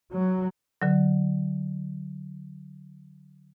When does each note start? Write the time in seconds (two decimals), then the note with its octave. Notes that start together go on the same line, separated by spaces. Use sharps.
0.10 F#3
0.82 D3 F#3